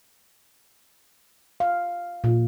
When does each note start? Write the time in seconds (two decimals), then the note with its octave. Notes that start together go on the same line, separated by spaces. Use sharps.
1.60 F5
2.24 A#2